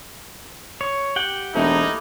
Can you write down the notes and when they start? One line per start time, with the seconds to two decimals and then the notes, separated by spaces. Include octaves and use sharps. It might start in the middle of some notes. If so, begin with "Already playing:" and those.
0.81 C#5
1.16 G4 F#5 G5
1.55 E1 A3 A#3 D#4 E4